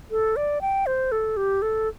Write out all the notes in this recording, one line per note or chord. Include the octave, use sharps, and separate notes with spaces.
A4
D5
G5
C5
A4
G4
A4